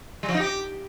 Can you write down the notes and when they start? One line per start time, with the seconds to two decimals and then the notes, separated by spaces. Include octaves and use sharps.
0.23 G3
0.29 F3
0.34 D#4
0.40 G4